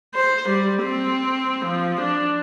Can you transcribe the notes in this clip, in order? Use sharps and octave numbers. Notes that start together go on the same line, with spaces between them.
C5
G3
C4
F3
D4